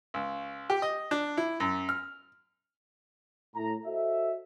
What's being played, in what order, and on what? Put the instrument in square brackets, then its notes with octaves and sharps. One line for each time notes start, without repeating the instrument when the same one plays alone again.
[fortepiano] C#2
G4
D#5
D4
E4
F#2
F6
[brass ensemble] A2 A#5
F#4 A4 C5 D#5 E5